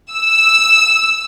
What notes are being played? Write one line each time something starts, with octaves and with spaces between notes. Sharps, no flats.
E6